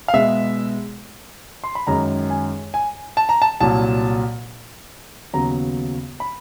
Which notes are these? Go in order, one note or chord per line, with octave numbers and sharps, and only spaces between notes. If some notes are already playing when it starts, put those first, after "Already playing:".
F5
B2 G#3 B3 E5
C6
B5
F#2 D#3 G#3 A#5
G#5
G#5
A5
A#5
A5
C2 A#2 F#3 A5
D#2 C#3 F#3 B3 A#5
B5